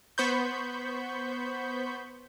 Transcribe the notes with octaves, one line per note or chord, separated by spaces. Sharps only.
B3 C5 B5 C#6 G6